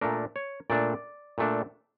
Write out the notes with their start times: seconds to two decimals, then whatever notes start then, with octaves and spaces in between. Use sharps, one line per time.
0.01 A#2 A3 D4 A#4
0.36 C#5
0.70 A#2 A3 D4 D5
1.38 A#2 A3 D4